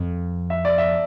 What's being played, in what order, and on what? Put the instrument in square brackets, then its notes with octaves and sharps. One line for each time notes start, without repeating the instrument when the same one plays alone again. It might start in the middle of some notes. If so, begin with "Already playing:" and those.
Already playing: [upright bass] F2
[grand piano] E5
D5
E5